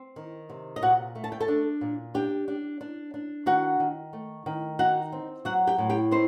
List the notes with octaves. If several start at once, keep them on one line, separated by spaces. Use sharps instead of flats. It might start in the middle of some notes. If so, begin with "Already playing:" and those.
Already playing: C4
D#3
C3
D#5
A#2 F#4 F#5
A3
A5
G5
A4 A5
D4
A#2
D4 G4 G5
D4
D4
D4
D#3 F#4 F#5
D#3
A3
D#3
D#4 F#4 F#5
C4
F#3 F#4 F#5
G4 G5
A2
G4 G5
C4 D#4 C5